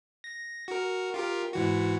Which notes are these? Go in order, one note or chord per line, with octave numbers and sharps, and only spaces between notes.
A#6
F#4 A#4
F4 G4 A#4
G#2 E3 F#4